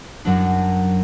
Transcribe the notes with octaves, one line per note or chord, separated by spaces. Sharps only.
F#2 F#3 D4